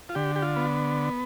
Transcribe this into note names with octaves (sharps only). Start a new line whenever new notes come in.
F4
D3 G4
G4
F4
B3